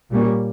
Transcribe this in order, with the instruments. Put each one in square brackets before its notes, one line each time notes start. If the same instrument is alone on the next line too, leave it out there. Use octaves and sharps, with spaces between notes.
[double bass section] A#2 G3 A#3 C#4